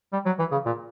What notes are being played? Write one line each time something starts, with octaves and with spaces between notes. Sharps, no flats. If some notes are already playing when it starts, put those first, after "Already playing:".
G3
F#3
E3
C#3
A#2